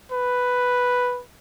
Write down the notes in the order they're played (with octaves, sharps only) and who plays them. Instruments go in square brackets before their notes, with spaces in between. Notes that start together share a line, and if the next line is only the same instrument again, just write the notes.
[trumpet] B4